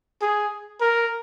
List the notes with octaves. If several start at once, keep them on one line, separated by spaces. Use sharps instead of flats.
G#4
A#4